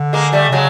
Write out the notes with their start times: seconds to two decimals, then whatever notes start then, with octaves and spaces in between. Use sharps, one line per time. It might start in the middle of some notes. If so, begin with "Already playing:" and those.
Already playing: D3
0.13 G#3 A#3
0.33 G3 A3
0.48 C3
0.52 C#3 F#3 G#3